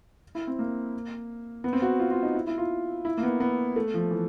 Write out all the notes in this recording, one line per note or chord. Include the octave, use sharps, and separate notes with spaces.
E4
C4
A#3
B3
C4
F#4
F4
F4
D#4
E4
E4
F4
E4
A#3
B3
B3
A3
F3
E3